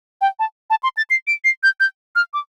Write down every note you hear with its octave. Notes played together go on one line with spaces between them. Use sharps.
G5
A5
A5
C6
A6
C7
D7
C7
G6
G6
F6
D6